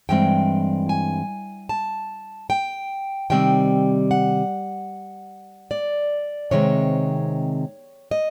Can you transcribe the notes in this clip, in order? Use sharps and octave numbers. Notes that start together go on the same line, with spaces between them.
G2 E3 G#3 C4 G5
G#5
A5
G5
C3 D#3 G3 C4 G5
F#5
D5
C3 D#3 G#3 C4 C#5
D#5